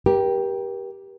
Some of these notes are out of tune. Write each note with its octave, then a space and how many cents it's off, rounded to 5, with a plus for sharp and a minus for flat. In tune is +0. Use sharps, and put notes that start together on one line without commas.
G4 +0 A#4 +35